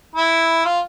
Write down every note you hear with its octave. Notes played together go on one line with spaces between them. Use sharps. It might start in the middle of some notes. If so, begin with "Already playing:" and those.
E4
F4